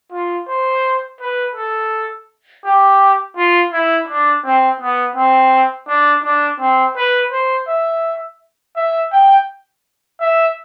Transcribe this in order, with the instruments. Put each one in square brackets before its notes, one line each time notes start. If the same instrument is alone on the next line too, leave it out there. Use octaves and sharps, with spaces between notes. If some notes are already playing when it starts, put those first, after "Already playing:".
[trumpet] F4
C5
B4
A4
G4
F4
E4
D4
C4
B3
C4
D4
D4
C4
B4
C5
E5
E5
G5
E5